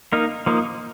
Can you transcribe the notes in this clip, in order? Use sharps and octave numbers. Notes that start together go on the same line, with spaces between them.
A#3 D#4 A#4
F3 A#3 D#4